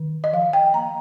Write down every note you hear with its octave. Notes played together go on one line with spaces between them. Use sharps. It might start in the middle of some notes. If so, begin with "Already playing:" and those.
Already playing: D#3
D#5
F3 F5
G5
A#3 A#5